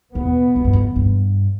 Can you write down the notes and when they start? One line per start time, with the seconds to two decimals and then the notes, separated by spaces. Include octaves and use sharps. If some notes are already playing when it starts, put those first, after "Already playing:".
0.15 E2 B2 B3
0.56 F2
0.64 G2
0.73 F2
0.96 G2